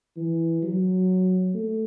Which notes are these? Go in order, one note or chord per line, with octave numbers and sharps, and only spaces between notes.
E3
F#3
A3